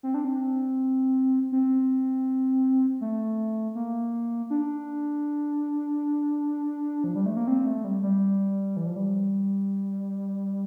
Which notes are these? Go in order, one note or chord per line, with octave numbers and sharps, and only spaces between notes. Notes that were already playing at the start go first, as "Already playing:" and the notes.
C4
D4
C4
C4
A3
A#3
D4
F3
G3
A3
A#3
C4
A3
G3
G3
E3
F3
G3